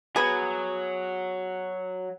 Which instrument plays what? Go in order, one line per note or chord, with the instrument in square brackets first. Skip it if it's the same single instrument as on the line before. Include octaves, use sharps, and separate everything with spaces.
[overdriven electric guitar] F#3 [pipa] B3 G#4